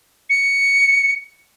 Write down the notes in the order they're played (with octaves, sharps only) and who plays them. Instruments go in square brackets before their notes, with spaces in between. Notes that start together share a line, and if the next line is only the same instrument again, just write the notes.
[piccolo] C#7